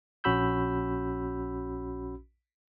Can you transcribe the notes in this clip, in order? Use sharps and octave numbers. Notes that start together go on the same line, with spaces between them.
A#1 C#4 F#4 B5 E6 G6